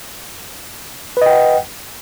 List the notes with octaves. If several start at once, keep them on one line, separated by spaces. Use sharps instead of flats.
B4 D#5 F#5 G5